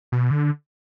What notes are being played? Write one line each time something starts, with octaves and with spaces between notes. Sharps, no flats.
B2
D3